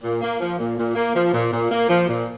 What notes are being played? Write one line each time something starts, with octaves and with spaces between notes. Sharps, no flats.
A#2
A#3
F3
A#2
A#2
A#3
F3
A#2
A#2
A#3
F3
A#2